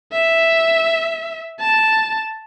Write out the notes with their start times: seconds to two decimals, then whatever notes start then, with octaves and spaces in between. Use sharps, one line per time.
0.12 E5
1.60 A5